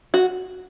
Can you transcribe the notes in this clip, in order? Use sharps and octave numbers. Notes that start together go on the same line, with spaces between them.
F#4